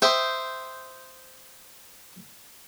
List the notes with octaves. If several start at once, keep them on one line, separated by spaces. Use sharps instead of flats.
C5 D#5 E5 G5